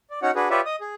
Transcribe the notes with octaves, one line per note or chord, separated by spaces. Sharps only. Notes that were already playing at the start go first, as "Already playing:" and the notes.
D5
C#4 D#4 F#4 C#5 F#5
D4 F#4 G#4 B4
F4 G4 B4 C#5 D5 E5
D#5 D#6
G#4